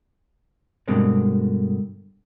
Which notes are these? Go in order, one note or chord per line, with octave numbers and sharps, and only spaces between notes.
G2 B2 D3 G#3 A#3 C4